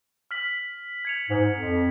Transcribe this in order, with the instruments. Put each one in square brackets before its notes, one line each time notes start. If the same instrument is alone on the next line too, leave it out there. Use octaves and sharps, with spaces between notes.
[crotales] F6 B6 F#7
G#6 C#7 F7
[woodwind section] G#2
F2